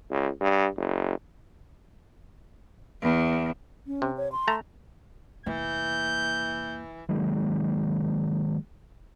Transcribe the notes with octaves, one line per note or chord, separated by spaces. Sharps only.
C#2
G2
F#1
E2
C#4
C3
C#5
C6
A3 A5 A#5
F1 E3 A#3 G6
D#3 F#3 G#3 A#3